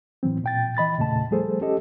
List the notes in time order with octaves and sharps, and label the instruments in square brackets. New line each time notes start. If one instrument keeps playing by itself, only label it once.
[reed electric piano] A2 E3 F#3 C4
A#2 G5 A6
E3 D#5 B5 A6
E2 A#2 C#3 A3 A5
F3 G3 A3 G#4 A4 C5
C#4 G4 A4 D#5